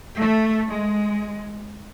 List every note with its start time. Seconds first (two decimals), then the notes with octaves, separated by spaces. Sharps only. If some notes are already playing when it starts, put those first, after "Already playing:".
0.18 A3
0.68 G#3